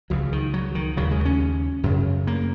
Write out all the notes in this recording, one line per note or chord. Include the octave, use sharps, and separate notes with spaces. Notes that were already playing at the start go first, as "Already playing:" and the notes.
C#2 C#3 F#3
D#3
F#3
D#3
D#2 C#3 F#3
G#3
C#4
F#2 C#3
A#3